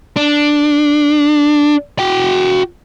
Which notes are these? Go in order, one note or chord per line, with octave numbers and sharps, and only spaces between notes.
D4
F#4 G5